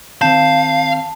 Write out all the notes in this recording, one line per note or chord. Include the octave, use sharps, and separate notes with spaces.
D#3 C4 F5 A5 G6